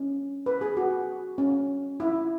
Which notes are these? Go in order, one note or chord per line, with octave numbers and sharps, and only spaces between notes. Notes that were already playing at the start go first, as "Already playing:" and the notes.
Already playing: C#4
B4
G#4
F#4
C#4
E4